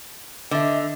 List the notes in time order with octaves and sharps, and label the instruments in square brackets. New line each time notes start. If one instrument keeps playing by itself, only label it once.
[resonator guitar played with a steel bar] D3 [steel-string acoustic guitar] D#5 E5